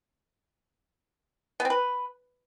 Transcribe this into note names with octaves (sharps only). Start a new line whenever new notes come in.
B3
C4
B4